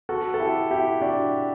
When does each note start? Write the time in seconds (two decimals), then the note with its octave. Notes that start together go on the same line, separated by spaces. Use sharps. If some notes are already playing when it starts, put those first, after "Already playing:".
0.09 F#4 A4
0.34 A4
0.40 E4 G4
0.71 E4 G4
1.01 D4 F#4